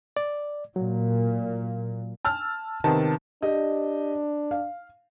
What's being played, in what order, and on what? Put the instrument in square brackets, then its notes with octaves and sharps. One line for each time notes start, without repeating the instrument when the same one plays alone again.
[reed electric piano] D5
[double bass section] A#2 [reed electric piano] F#3
[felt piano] A5 E6 F6
[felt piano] C3 B3 [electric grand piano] D#3 A5
[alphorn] D4 [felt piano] G4 D#5
[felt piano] F5